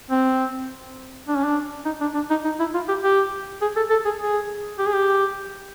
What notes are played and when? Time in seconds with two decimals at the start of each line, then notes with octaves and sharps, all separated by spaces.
0.10 C4
1.28 D4
1.36 C#4
1.44 D4
1.85 D#4
2.01 D4
2.15 D4
2.30 D#4
2.44 D#4
2.59 E4
2.74 F4
2.88 G4
3.03 G4
3.62 G#4
3.76 A4
3.90 A4
4.05 G#4
4.20 G#4
4.78 G4
4.86 G#4
4.94 G4